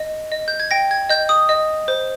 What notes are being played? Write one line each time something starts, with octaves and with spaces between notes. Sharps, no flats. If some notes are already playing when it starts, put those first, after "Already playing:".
Already playing: D#5
D#5
G6
G#6
G5 A#6
G#6
D#5 G6
D#6
D#5
C5